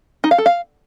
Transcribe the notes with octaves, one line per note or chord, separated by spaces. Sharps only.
D#4
F5
A4
F5